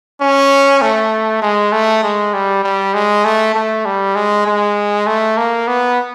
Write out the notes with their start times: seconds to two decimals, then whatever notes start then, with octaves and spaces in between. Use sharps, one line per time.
0.21 C#4
0.82 A3
1.42 G#3
1.72 A3
2.03 G#3
2.34 G3
2.63 G3
2.94 G#3
3.25 A3
3.55 A3
3.86 G3
4.16 G#3
4.46 G#3
5.07 A3
5.37 A#3
5.68 B3